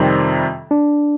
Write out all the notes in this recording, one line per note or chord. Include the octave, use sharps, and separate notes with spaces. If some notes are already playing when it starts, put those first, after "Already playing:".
Already playing: F2 C3 D#3 G3 C4
D4